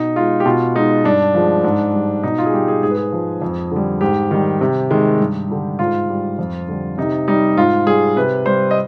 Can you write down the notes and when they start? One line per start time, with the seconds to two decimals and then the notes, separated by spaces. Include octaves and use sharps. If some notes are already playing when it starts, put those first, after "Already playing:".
Already playing: B2 D#4
0.16 G#3 F4
0.40 G4
0.46 B2 F4
0.75 G#3 D#4
1.04 G2 D4
1.34 F3 G#3
1.64 G#2
1.93 G3
2.23 B2 D#4
2.38 F4
2.46 G#4
2.53 G3 G4
2.68 G#4
2.83 G#2 G#4
2.90 B4
2.97 G#4
3.12 F3 G#3
3.42 F2
3.72 D3 G3
4.01 G#2 G4
4.31 D#3 G3
4.61 C3
4.91 D#3 G#3
5.20 G2
5.50 D3 G3
5.79 G#2 F4
6.09 G3
6.39 F2
6.68 D3 G3
6.98 C3 D#4
7.28 G3 D#4
7.57 G#2 F4
7.87 G3 G#4
8.16 C3 B4
8.46 G3 C5
8.71 D#5